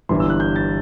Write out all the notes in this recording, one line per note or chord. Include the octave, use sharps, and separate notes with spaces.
G1 G2 E3 C6
E6
F#6
G6
A6